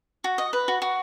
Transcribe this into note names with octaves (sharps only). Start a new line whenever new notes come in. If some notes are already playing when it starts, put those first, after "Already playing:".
F#4
D#5
B4
F#4
F#4